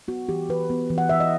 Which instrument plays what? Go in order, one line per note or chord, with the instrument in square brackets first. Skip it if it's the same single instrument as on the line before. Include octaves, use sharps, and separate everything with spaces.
[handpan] B3 F#4
E3 G4
E3 B4
B3
E3
F#5
E3 E5
D#5